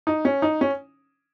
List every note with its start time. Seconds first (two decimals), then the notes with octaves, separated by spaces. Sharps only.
0.07 D#4
0.25 C#4
0.42 D#4
0.61 C#4